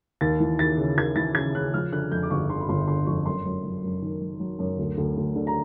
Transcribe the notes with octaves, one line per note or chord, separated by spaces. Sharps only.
D#2 A6
E3
D#2 A6
C#3
D#2 G#6
E3 A6
C#3 G#6
C#3 F#6
F3 F6
D3 F#6
F2 G6
D6
G1 C#6
D3 C6
B5
G1 C6
D3 C6
F2 C#6
F#2 C6
F#2
F#3
F#2
D#3
F#3
F#3
F#2
D2
D2
D2
D3
A#5